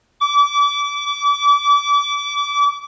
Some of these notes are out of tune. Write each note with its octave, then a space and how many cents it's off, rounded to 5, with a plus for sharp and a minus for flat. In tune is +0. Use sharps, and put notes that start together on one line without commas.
D6 -30